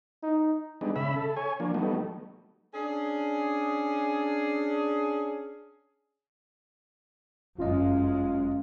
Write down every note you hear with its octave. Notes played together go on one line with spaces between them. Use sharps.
D#4
G3 G#3 B3 D4 D#4
C#3 E5 B5
A4
C#5 G#5
F3 A#3 D4
F#3 G3 A3 B3 D#4
C#4 D4 G#4
G1 F#2 G#3 C#4 F4 D#5